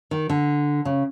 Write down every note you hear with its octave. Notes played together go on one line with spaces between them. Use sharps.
D#3
D3
C#3